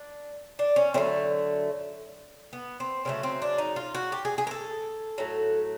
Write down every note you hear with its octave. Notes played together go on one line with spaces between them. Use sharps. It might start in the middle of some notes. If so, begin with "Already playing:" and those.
Already playing: D4
D4
C#4
D3 F#3 A3 C4
B3
C4
C#3 F#3 A3 C4
C4
D4
D#4
F4
F#4
G4
G#4
G#4
A#4
A4
A2 F#3 A3